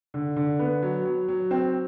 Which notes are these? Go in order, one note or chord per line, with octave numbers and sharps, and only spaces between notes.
D3
D3
B3
F#3
F#3
F#3
C4